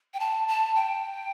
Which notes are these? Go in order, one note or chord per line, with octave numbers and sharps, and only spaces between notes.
G5
A5
A5
G5